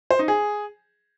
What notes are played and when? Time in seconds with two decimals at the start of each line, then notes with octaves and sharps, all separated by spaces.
0.11 C5
0.19 D#4
0.28 G#4